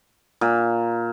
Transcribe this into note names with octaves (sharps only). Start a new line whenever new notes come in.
A#2